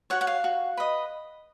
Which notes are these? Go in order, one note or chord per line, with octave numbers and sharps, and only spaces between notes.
F#4 C#5 F#5
F#5
F5
F#4
B4 D#5